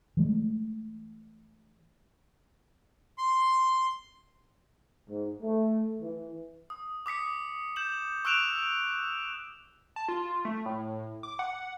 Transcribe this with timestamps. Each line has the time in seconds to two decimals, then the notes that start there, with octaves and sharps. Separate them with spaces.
0.17 E3 G#3 A3
3.18 C6
5.09 G#2
5.42 A3
6.01 E3
6.70 D#6
7.06 D6 D#6 B6 C#7
7.76 G6 E7 F#7
8.25 C#6 E6 F#6 D7 E7 F7
9.96 A5
10.08 F4
10.45 A3
10.66 A2
11.23 D6
11.39 F#5